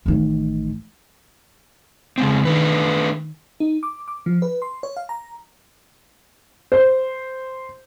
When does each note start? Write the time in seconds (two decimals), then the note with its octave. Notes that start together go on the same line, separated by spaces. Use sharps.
0.06 A1 D#3
2.18 C#3 G#3 C4
2.45 D#3 A3 D4 B4
3.60 D#4
3.83 D6
4.08 D6
4.26 F3
4.42 B4
4.62 C6
4.83 C#5
4.97 F5
5.09 A#5
6.72 C5